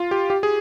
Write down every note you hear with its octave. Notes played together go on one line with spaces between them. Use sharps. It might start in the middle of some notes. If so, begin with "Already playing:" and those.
Already playing: F4
G4
G4
G#4